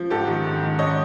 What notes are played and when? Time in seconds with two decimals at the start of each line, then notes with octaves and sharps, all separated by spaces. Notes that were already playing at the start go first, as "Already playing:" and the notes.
Already playing: F3
0.10 G#2 G4 A4
0.27 D#3
0.45 G#2
0.63 D#3
0.79 G#2 C#5 D#5